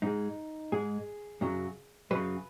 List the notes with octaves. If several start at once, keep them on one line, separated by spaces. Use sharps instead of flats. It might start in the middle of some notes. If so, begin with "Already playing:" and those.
G#2 G#3 D#4
G#2 G#3 G#4
F#2 C#3 F#3
F#2 C#3 F#3 B4